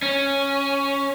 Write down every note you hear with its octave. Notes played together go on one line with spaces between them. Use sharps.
C#4